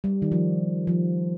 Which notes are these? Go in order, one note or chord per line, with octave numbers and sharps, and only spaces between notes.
G3
D#3
F3
F3